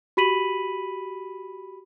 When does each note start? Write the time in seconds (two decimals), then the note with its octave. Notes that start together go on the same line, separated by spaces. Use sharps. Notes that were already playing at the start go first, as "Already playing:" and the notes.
0.17 F#4 G4 B5 B6 D#7 F#7